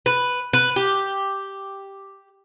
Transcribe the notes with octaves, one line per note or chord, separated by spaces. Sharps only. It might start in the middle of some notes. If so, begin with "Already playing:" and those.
B4
B4
G4